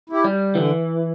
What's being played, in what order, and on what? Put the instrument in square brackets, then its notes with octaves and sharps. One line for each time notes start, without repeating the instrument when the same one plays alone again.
[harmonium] E4 G4
[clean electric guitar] G3
[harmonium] D3 [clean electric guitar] E3